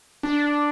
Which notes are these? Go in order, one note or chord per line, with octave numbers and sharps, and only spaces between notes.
D4